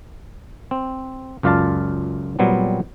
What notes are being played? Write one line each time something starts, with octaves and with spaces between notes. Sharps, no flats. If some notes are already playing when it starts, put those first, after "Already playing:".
C4
C#2 F#2 F4 D5 F5 A5
A#2 F#3 G3 B3 C4